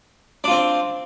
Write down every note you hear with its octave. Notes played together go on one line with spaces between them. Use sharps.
C4 D4 F4